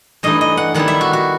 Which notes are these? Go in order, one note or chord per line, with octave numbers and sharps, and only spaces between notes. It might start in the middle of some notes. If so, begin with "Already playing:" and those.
G2 E3 A3 D#4 D#5
D#5
F#5
D#3 G3 B3 E4 F#5
E5
F#4
F#4